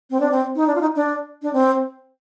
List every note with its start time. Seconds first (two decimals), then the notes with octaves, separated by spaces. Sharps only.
0.10 C4
0.20 D4
0.31 C4
0.56 D#4
0.67 D4
0.75 F4
0.81 D#4
0.96 D4
1.42 D4
1.53 C4